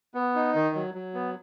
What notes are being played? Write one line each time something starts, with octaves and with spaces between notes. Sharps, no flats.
B3
D#4
D#3
F#3
F#3
B3